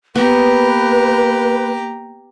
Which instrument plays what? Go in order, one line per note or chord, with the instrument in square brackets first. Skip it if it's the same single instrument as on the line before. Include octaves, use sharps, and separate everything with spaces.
[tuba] A#3 [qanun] B3 [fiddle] G4 A#5 [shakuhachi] B4